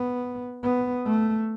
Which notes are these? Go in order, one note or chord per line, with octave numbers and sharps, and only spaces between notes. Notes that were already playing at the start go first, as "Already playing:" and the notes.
Already playing: B3
B3
A3